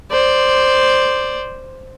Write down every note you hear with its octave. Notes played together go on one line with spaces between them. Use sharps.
C5 D5